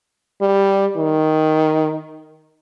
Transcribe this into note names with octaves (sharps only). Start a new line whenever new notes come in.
G3
D#3